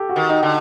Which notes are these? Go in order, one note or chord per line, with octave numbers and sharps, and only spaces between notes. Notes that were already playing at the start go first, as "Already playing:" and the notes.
Already playing: G4 A4
F#4
D#3
D#4
D3